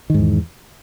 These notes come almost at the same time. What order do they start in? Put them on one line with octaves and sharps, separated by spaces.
D#3 G#2 E2